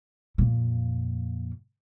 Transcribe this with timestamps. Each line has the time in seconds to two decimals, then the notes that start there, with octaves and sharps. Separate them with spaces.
0.38 F2 A#2